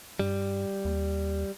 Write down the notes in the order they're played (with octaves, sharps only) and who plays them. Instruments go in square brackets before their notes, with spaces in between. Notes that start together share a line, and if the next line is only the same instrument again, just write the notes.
[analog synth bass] G2 [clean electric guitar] G3
[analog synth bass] D#2